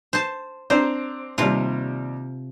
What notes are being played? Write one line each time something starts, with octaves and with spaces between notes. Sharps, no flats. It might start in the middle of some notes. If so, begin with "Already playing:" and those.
C5 A5
C4 D4 C5 A#5
D#2 C3 G3 F4